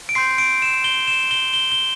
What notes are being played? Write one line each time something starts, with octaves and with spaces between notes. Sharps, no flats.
D7
C6 G6 C7
D7
E7
G7
E7
G7
G7
G7